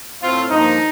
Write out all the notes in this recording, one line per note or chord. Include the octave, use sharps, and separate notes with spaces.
A2 A3 C4 F4
G2 F3 A#3 D#4